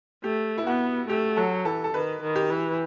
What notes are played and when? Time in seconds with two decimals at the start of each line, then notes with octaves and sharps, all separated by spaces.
0.24 A3 G4
0.58 E4
0.67 B3 F#4
1.09 A3 G4
1.37 F#3 A4
1.65 E3 A4
1.84 A4
1.94 D#3 B4
2.22 D#3
2.36 G4
2.50 E3